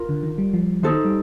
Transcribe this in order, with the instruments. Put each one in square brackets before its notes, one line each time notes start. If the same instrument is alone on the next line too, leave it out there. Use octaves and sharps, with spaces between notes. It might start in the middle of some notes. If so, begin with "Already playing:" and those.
Already playing: [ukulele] F4 A#4
[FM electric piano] D3
D#3
G3
F3
[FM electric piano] D#3 [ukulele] D#4 A4 C5
[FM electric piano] G3